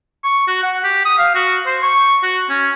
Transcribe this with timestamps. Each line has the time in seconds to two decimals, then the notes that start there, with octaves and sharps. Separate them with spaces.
0.24 C#6
0.48 F#4
0.63 F#5
0.84 G4
1.05 D#6
1.18 F5
1.35 F#4
1.67 C5
1.82 C#6
2.23 F#4
2.50 C#4